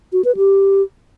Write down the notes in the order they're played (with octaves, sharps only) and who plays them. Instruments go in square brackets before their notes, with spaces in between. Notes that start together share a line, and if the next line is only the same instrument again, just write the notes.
[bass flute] F#4
B4
G4